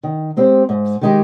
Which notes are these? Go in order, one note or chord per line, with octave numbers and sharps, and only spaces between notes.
D#3
G#3 C4 G4 C5
G#2
D#3 G#3 D#4 G4